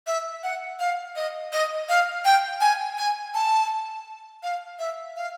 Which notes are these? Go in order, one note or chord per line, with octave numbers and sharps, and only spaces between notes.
E5
F#5
F5
D#5
D#5
F5
G5
G#5
G#5
A5
F5
E5
F5